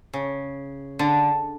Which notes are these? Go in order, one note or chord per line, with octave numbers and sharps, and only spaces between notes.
C#3
D3